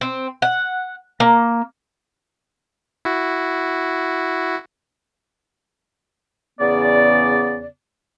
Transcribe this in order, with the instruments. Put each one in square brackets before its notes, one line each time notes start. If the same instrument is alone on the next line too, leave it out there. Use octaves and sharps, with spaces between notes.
[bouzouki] C4
F#5
A#3
[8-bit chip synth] E4 F#4
[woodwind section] E2 C#3 B3 D5